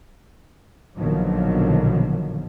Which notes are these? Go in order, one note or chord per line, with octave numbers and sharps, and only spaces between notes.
A#1 B2 D3 D#3 F3 F#3